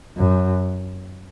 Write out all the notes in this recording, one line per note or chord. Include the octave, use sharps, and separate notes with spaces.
F#2